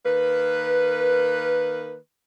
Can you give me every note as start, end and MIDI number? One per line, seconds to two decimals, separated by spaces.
0.05 1.97 51
0.05 1.97 58
0.05 1.97 71